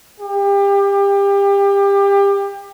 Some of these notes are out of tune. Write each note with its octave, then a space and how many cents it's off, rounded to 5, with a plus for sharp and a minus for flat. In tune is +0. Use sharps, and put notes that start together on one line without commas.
G4 +25